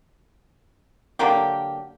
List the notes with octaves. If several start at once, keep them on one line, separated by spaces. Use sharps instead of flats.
D3 F#3 A#3 G4